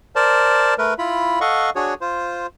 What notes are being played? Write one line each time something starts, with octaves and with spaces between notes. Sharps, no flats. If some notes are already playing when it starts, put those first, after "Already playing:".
A#4 C5 D5 A5
A3 A#4 B4
E4 F4 B5
A4 D#5 F5 F#5 C#6
D4 F#4 G#4 C#5
F4 C5